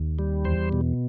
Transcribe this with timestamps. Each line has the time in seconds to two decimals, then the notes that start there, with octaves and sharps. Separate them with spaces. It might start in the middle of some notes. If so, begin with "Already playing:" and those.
Already playing: D#2
0.19 G3
0.45 E2 C5
0.73 B2